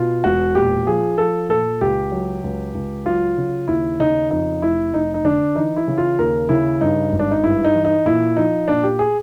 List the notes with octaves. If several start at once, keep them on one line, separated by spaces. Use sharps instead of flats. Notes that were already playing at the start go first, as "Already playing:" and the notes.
Already playing: B2 F4
E1 F#4
A#2 G4
F3 G#4
F3 A4
A#2 A4
C#2 G4
F#3
C#2
C#2
F#3 F4
C#3
D#2 E4
C#3 D#4
F2 D#4
F1 E4
F1 D#4
D#4
D3 D4
E3 D#4
E4
C#3
F4
D#2 A#4
C#3 E4
G2 D#4
G#1
D4
D#4
G2 E4
D#4
E3
D#4
A#2 E4
F3 D#4
A#2 D4
G4
G#4